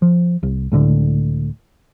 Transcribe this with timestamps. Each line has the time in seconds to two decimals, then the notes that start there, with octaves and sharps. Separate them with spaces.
0.02 F3
0.43 C2
0.72 C#2 A2 D3